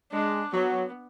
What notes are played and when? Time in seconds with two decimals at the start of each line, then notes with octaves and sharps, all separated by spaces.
0.12 G#3 D4
0.54 F#3 B3